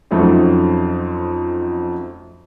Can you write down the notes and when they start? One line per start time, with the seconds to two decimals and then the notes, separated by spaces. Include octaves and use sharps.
0.11 F2 F#3 A3 C4 C#4 D#4